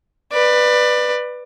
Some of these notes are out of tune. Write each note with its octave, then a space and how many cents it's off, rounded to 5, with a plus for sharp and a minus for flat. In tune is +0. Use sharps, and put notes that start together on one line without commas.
B4 +0 D5 +25